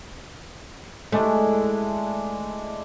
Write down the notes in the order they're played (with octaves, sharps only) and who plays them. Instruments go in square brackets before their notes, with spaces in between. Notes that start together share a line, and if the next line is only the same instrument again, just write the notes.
[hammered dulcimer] G#3 D4 E4 [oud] A3